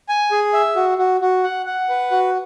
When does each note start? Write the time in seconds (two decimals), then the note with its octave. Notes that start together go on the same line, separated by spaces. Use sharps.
0.09 G#5
0.31 G#4
0.54 E5
0.76 F#4
0.98 F#4
1.21 F#4
1.44 F#5
1.66 F#5
1.89 B4
2.11 F#4